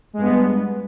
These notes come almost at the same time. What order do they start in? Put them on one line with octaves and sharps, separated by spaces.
G#3 G2 B3